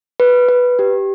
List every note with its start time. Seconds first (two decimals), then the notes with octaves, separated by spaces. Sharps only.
0.20 B4
0.49 B4
0.79 G4